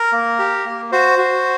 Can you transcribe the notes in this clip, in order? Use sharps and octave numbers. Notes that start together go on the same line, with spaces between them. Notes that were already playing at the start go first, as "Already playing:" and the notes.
Already playing: A#4
A#3
G4
A#3
F#4 C5
F#4